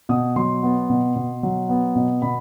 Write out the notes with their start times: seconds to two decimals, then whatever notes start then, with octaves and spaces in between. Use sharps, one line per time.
0.09 B2 D#6
0.36 F#3 C6
0.63 B3
0.90 B2
1.16 B2
1.43 F#3
1.69 B3
1.96 B2
2.22 B2 B5